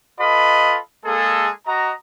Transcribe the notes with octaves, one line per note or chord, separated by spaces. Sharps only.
F4 A4 B4 D#5 B5
G#3 A#3 G#4 A4
F#4 D#5 A#5